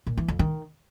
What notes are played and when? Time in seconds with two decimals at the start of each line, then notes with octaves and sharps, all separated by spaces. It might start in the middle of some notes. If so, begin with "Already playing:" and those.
0.07 A#2
0.17 E3
0.28 F2
0.39 D#3